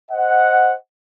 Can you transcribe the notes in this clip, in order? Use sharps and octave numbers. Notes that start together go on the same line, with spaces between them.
C5 D#5 F#5